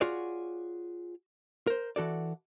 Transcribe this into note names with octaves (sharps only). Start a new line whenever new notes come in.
F4 F#4 G#4 C#5 D5
A#4 C5
E3 F#4 A4 D5